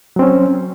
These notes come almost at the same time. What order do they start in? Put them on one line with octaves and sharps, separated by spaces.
F#3 C4 C#4